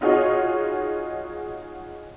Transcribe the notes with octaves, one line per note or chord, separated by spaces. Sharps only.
D#4 F4 F#4 G#4 C#5 D#5